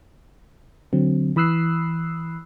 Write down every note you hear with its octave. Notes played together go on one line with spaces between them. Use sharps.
D3 F#3 C4
E3 B5 D#6 E6 F#6 C7